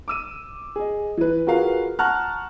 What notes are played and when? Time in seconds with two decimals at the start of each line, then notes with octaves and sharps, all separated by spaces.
0.08 D6 E6 D#7
0.76 G#4 D#5
1.17 E3 B4
1.47 F4 F#4 G#4 A#4 B4 F5
1.99 F#5 A5 A#5 C#6 F6 F#6